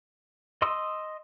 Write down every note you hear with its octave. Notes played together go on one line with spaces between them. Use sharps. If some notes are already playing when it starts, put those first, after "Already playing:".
D#5 C6 D#6 E6